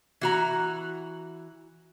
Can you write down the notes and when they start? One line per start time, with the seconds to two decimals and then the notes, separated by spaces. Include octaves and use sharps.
0.21 E3 F#4 A#5